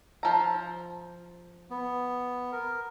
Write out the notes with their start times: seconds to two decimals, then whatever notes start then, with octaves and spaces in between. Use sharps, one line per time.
0.23 F3 A#5
1.70 B3
2.52 A#4